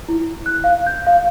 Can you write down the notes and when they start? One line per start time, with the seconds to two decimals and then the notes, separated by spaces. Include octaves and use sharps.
0.09 E4
0.46 F#6
0.64 F5
0.87 G6
1.07 F5